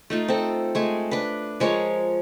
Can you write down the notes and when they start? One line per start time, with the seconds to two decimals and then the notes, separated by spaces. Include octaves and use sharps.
0.10 A3 D#4 F4
0.28 C4 A4
0.75 G#3 A3 G#5
1.11 D4 B4
1.60 F3 G#3 A#4 C#5